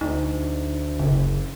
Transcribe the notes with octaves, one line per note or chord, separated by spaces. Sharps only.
D2 D#4
F#1 C#3